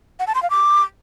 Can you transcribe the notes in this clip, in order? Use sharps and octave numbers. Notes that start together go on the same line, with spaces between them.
F#5
A5
C6
F5
D6